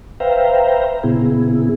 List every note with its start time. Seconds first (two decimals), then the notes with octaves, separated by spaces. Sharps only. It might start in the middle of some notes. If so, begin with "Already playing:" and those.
0.20 B4 C5 E5 F5 G5 A#5
1.03 A#2 C#3 B3 E4 G#4